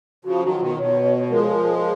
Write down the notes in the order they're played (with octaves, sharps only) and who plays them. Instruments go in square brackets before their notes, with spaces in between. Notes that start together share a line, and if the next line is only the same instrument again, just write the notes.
[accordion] C#3 F3 [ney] F#4
[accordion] D#3 F#3 [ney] F#4
[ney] F4
[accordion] B2 D#3
[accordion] B2 [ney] C#5
[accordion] F3 G#3 [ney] A#4
[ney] G#4
A#4